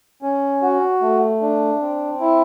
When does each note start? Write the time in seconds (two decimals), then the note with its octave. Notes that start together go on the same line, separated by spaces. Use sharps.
0.22 C#4
0.62 F#4
1.02 A3
1.42 D4
1.81 C4
2.20 E4